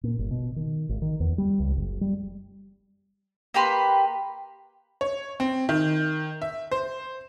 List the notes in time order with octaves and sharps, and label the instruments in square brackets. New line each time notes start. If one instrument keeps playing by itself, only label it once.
[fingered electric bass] A#2
G1
B2
D#3
G#1
D#3
E2
G3
C#2
F#1
G3
[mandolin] A#3 G4 B4 C6
[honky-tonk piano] C#5
C4
D#3
E5
C5